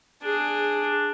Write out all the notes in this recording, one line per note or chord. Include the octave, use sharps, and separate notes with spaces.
D4 G#4